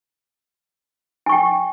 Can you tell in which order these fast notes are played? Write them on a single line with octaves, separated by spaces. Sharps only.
G#5 C#6 G5